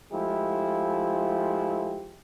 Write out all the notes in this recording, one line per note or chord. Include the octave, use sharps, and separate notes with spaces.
F3 G#3 A3 E4 G4